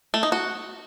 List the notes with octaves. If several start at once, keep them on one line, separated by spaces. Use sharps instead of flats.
A3
D#4
F#4